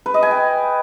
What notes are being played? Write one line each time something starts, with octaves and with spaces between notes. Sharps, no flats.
B4
D#5
G#5
G5